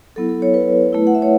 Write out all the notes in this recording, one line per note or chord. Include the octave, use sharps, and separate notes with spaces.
F#3 B3 E4 A4
A4
C#5
B4
A3 E4
F#5
E5
C#5